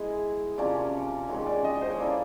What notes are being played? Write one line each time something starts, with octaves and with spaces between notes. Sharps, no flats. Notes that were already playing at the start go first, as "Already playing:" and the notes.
Already playing: G#3 B3 E4 G#4 D#5
C3 F3 A#3 C#4 D5
D#3 G#3 C#4 C#5
D5
D#5
C5
C#5
A#3 C#4 E4 A4 D5